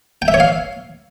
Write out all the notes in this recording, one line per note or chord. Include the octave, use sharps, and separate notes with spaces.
G5
E5
C#5
F5